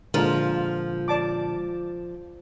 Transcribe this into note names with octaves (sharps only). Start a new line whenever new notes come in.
A#2 D3 F3 G#3 F4 A4 A#4
D5 A5 D6